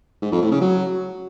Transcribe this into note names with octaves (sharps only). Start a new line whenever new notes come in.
G#2
F2
A2
C#3
F#3